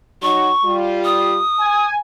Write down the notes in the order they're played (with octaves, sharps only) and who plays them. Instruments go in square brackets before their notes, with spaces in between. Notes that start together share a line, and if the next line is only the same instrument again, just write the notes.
[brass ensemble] F#3 D#4 F#4 [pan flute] C#6
[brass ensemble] G3 F4
[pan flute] D#6
[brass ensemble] G#5